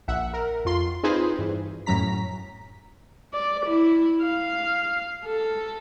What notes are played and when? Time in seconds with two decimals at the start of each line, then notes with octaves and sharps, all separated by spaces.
0.08 A#1 E5 F#5
0.33 A#4
0.65 F2 F4 C6
1.03 C4 D#4 F4 G#4 B4 C5
1.39 G2 E3
1.86 F#2 A2 F#3 C#4 A#5 B6
3.33 D5
3.66 E4
4.23 F5
5.25 A4